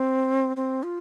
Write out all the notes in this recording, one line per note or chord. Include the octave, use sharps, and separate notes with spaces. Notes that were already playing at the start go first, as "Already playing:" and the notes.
Already playing: C4
C4
F4